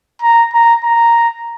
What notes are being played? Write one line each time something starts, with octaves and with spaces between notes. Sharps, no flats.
A#5
A#5
A#5